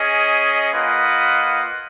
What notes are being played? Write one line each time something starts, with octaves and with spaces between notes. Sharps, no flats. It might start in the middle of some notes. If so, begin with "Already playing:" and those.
Already playing: C#4 G#4 D#5
A#3 F4 B4 D#5 F#5